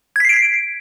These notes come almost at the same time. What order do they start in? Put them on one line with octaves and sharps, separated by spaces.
G#6 B6 C7 D7